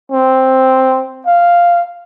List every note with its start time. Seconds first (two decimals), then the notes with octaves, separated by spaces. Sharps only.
0.12 C4
1.27 F5